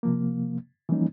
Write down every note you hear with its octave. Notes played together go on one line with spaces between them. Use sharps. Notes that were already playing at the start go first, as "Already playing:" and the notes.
C3 F3 A#3
E3 F3 G3 A#3 C#4 D#4